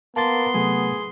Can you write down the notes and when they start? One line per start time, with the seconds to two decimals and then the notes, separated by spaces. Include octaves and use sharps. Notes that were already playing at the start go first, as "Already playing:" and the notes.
0.16 A#3 B3 A5 C6 A6
0.54 C3 F#3 A3 G#4